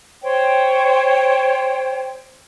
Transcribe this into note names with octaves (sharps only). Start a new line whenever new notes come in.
C5 C#5 G5